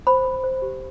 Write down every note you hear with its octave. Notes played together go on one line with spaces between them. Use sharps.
C5 B5
C5
C5
G4